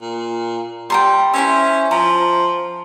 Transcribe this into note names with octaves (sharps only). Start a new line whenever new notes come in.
A#2
G3 G5 A#5 C6
C#4 E4 C5 E5
F3 A#5